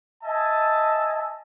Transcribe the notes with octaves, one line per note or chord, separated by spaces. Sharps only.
D#5 E5 G#5 A5